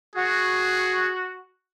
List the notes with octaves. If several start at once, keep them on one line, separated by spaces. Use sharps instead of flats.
F#4 G#4